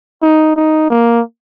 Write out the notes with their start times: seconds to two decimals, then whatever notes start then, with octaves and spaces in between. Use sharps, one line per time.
0.22 D#4
0.56 D#4
0.90 A#3